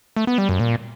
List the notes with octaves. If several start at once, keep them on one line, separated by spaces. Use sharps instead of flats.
A3
B3
G3
F#2
A#2